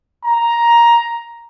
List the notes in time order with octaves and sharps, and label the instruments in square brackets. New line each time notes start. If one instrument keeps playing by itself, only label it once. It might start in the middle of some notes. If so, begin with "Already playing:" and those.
[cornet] A#5